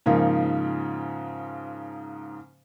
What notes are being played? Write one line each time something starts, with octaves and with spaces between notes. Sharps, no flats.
G#2 C#3 F3 A#3 D#4